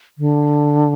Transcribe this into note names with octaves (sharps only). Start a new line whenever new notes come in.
D3